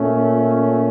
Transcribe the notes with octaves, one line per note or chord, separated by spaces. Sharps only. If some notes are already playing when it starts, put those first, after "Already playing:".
Already playing: A#2 A3 C#4